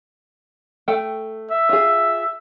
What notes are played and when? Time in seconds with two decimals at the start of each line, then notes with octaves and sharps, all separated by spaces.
0.88 A3 A4 G5
1.51 E5
1.69 F4 G#4